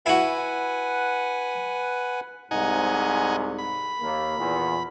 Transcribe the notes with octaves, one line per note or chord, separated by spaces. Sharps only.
E4 F#4 B4 F#5 G#5
C2 G#2 D#4 F#5 G#5
B5
D#2 A#3
E2 A#2 E3